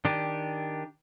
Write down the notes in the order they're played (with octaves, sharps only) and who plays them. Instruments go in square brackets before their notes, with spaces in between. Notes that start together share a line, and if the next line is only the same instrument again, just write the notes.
[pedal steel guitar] D#3 D4 G4